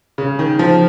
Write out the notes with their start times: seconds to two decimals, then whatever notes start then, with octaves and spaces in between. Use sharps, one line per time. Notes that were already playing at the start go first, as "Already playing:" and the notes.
0.18 C#3
0.39 D#3
0.59 F3